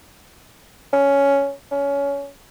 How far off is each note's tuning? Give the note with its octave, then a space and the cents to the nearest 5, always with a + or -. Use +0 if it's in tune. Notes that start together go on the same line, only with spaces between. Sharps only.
C#4 +10
C#4 +20